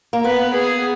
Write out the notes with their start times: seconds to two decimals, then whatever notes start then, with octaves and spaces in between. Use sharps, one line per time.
0.13 A#3
0.24 B3 B4
0.54 G#4